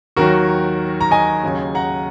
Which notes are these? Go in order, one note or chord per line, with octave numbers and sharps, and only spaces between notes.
D#2 D#3 F#3 F#4 A#4
A#5
D#5 G#5
D#2 C#3 F#3
F#5 A#5